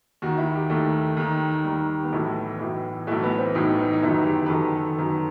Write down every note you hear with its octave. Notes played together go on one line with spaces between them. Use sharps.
D#2 D#3 F#4
E4
G4
D#2 D#3 A3
D#2 D#3
D#2 D#3 G3
B3
B1 A2 E3 A3
B1 A2 E3
B1 A2 E3 A3
B3
C4
B1 A2 E3 D#4
D#4
D#4
G1 F#2 D#3 E4
G4
B4
G1 F#2 D#3 A4
G1 F#2 D#3